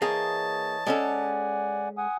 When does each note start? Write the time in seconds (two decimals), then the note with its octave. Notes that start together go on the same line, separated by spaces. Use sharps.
0.02 E3 A#3 G#4 C#5 D#5 A5
0.87 G#3 C#4 A4 D5 F#5 G#5
1.97 F#5 G#5 D#6